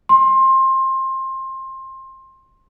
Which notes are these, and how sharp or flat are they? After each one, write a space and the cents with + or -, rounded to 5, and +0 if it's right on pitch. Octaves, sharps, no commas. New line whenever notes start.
C6 +20